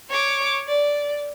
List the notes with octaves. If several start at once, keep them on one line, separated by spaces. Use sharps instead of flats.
C#5 D6
D5